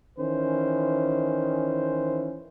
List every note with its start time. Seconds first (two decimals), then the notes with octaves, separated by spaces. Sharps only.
0.19 D#3 E3 C#4 C5